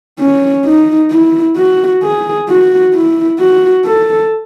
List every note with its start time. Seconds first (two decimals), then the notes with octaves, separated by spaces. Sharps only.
0.20 C#4
0.65 D#4
1.11 E4
1.57 F#4
2.03 G#4
2.49 F#4
2.94 E4
3.39 F#4
3.85 A4